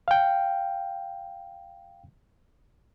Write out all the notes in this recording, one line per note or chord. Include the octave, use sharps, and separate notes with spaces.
F5 G5